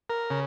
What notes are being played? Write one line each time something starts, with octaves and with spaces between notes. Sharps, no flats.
A#4
C#3